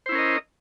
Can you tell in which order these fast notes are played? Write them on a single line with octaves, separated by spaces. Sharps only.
C5 E4 C#4 A#4 D#5